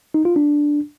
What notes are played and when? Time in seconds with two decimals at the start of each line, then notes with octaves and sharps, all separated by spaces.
0.14 D#4
0.25 F4
0.36 D4